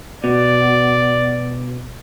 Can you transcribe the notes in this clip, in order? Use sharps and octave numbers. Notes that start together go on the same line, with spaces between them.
B2 D5